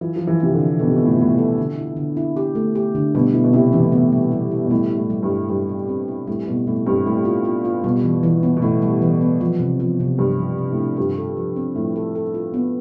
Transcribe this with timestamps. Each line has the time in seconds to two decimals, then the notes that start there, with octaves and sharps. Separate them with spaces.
0.01 E3 F4
0.16 F3
0.21 F4
0.27 E3
0.40 C3 F4
0.54 D3
0.59 C4
0.79 B2 A4
0.88 C3
0.96 B2
0.99 A4
1.06 A2
1.13 B2
1.19 A2 F4
1.32 B2
1.38 A4
1.58 D3
1.78 E4
1.97 D3
2.17 E4
2.37 G4
2.55 A3
2.75 G4
2.95 D3
3.15 B2 G3
3.34 B2 E4
3.44 B2
3.53 C3 E4
3.73 C3 E3
3.83 A2
3.92 B2 B3
4.12 G3
4.32 G3
4.51 E4
4.64 B2
4.71 A2 G3
4.91 E4
4.97 A2
5.10 G3
5.23 G2
5.30 G3
5.49 G2 G3
5.69 G4
5.89 C4
6.08 E4
6.27 A2 G3
6.47 B2 G3
6.67 A2 G3
6.86 G2 C4
7.06 A2 G3
7.25 F4
7.45 F4
7.65 F4
7.84 B2 G3
8.04 E3
8.23 E3
8.43 B3
8.57 B2
8.62 A2 B3
8.82 G3
9.02 E3
9.21 B3
9.41 F3
9.60 C3
9.80 F3
10.00 C3
10.19 G2 C3
10.39 F3
10.58 C3
10.72 A2
10.78 D4
10.97 G2 F4
11.17 A4
11.37 F3
11.56 C4
11.75 A2 F3
11.96 A4
12.15 A4
12.34 F4
12.54 B3